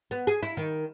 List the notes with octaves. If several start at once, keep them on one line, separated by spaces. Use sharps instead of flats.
B3
G#4
E4
D#3